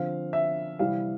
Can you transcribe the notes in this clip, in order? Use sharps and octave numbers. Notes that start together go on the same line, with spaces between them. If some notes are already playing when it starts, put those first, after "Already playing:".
Already playing: D3 F3 C4 F5
E5
C3 E3 G3 C4 E4 F5